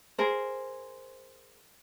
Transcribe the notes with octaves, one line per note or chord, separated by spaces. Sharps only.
G#4 A#4 C5